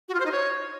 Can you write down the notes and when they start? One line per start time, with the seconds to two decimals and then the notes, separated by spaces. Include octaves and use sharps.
0.09 F#4
0.14 F4
0.20 C5
0.26 D#4
0.31 C#5